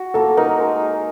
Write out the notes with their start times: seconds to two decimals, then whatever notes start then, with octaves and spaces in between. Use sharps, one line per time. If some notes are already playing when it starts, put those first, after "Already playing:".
Already playing: F#4
0.14 A#3 A4
0.37 D#4 A#4
0.59 G#3
0.82 G#4